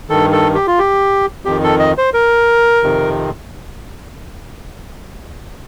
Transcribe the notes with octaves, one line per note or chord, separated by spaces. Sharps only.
G2 D#3 A4
A4
G4
F4
G4
F2 D#3 G4
A4
D#5
C5
A#4
F2 C3 D#3